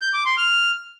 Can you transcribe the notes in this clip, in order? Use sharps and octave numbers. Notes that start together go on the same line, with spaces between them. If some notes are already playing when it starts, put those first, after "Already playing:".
G6
D6
C6
F6